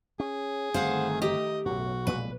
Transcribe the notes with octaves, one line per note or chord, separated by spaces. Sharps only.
C#4 G#4
G1 D#3 A3 C4 C5 F5 F#5
G4 D#5
B1 F#2 A2 F#4
F1 A#2 G#3 B4